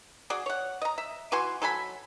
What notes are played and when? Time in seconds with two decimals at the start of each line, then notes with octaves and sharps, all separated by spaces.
0.30 F#4 G#4 D5
0.46 C#5 F#5
0.82 D#5 A#5
0.98 E5
1.32 E3 F#4 G#5 C6
1.62 F#3 A4 G#5 B5